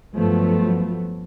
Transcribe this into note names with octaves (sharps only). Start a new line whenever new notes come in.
G2 F3 F#3 A3 B3